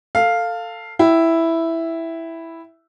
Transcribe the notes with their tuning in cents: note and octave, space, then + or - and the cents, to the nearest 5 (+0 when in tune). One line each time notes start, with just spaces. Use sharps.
A4 +20 F5 +0
E4 +0 G5 -25